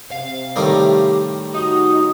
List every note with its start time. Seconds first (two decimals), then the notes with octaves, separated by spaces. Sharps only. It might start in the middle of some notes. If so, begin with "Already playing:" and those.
0.12 C3 F5
0.56 A2 D#3 G3 G4
1.54 D#4 F#4 D#6